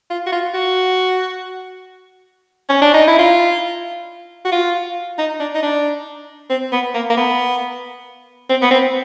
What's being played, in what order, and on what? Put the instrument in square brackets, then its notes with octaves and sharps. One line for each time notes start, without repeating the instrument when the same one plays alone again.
[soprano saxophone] F4
F#4
F4
F#4
C#4
D4
D#4
E4
F4
F#4
F4
D#4
D4
D#4
D4
C4
B3
A#3
A#3
B3
C4
B3
C4